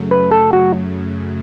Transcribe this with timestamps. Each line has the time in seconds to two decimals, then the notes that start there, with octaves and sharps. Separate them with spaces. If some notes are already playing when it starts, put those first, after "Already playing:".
Already playing: F#2 C#3 F#3 A3
0.11 B4
0.31 A4
0.53 F#4